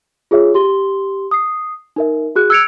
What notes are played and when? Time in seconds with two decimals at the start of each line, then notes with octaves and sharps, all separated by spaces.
0.31 F4 G#4 C#5 E5
0.54 G4 C6 G7
1.31 D#6 C7
1.96 D#4 A#4 E5
2.36 F#4 G#4 F#6
2.50 E6 F#6 G#6 C#7 D7 F7